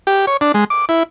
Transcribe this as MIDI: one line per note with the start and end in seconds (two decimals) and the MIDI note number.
0.07 0.26 67
0.27 0.37 73
0.41 0.52 62
0.54 0.64 56
0.70 0.85 86
0.89 1.03 64